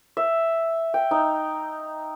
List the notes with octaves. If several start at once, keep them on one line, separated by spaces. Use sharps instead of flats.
E5
G5
D#4